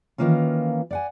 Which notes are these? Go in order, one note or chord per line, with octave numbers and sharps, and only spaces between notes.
D#3 E3 A#3 C#4 F4
D5 F#5 G#5